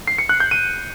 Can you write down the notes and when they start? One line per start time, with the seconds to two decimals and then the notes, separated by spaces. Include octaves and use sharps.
0.07 C7
0.18 C#7
0.29 F#6
0.40 G6
0.51 D#7